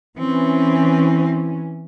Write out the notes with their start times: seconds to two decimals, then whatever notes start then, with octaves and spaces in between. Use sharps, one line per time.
0.19 E3 C4 C#4